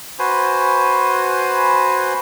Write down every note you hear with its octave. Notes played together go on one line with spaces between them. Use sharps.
F#4 B4 C5 G#5